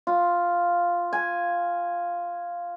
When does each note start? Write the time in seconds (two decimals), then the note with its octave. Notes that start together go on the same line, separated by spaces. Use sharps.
0.07 F4
1.13 G#5